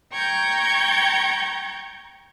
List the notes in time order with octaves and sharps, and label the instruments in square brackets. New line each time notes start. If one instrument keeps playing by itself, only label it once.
[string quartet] G5 A#5 C#6 G6 G#6